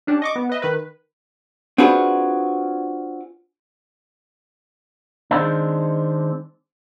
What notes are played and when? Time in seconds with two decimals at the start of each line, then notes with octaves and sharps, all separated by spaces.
0.07 C#4 D4 G4
0.22 D#5 C#6 D6
0.36 B3
0.49 B4 D#5 E5
0.62 D#3 B4
1.78 C4 D4 F4 F#4 G#4 B4
5.31 D#3 G#3 C4 D4